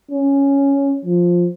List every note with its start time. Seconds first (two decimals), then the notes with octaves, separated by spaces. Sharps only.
0.11 C#4
1.05 F3